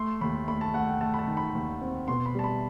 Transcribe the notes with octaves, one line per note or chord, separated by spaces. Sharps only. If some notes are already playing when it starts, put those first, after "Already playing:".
Already playing: A3 C6
D#2 B5
A3 B5
A5
A3 F#5
G5
A3 A5
B5
A5
D#3
B5
D#2
C4
B2 C6
B5
G3 A5
B5